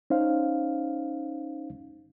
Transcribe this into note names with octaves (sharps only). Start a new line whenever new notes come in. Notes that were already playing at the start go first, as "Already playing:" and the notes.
C#4 D#4 C5 F5